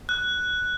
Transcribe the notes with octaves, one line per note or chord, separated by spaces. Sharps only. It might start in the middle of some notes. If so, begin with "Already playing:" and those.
F#6